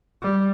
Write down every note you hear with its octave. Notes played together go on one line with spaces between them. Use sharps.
G3